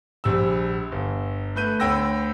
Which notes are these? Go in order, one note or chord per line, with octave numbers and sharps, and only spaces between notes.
A#1 G3 E6
G1
A3 B4 G6 D#7
D2 C#5 G5 B5 E6 A#6